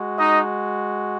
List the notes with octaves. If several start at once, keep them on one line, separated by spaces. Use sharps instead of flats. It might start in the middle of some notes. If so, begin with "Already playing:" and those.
Already playing: G#3 F#4
D#4 D#5